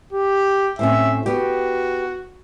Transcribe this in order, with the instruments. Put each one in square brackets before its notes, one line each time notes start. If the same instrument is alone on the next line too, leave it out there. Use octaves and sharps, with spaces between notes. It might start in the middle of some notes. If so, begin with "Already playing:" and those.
[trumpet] G4
[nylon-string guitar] A2 C4 C#4 [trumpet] E5
[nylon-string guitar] B3 G4 [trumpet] F#4